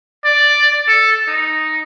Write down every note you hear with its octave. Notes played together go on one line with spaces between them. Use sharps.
D5
A4
D#4